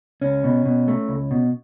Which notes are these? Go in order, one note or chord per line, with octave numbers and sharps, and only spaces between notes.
C#2 C#4
B2
B2
A3
C#2
B2